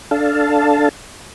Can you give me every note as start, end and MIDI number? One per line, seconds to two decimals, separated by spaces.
0.11 0.89 62
0.11 0.89 69
0.11 0.89 77
0.11 0.89 81